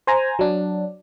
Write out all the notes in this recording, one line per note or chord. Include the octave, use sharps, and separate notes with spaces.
C5 G#5 A#5
F#3 D4